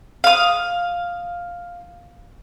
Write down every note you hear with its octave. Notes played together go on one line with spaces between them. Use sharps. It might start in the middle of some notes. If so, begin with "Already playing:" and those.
F5 D#6